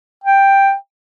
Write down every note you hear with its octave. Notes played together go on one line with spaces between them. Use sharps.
G5